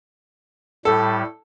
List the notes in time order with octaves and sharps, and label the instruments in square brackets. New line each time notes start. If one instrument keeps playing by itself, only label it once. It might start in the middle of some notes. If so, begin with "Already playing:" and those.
[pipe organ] A2 G3 [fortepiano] A4